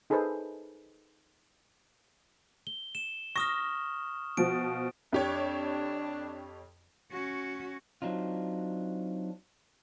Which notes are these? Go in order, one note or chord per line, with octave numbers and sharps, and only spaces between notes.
D#4 G#4 A4 B4 C5
G7
E7
C#6 D#6 F6 A#6
B2 F3 D7
F2 D4 G4 C#5
C#4 F#4
F#3 C4 D4 D#4 F4